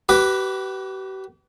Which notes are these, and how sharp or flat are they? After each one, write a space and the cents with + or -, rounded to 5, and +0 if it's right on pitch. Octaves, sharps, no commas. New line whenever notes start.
G4 -45 B4 +0 D6 +0